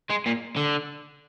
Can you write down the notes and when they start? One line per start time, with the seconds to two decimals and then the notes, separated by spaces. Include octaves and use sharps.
0.10 G#3
0.26 A#2
0.57 D3